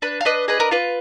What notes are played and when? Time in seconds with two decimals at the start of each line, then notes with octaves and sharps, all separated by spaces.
0.02 D4 B4
0.21 F5
0.25 D4 B4 D#5
0.48 G#4 B4 D#5
0.60 A#4
0.71 F4 B4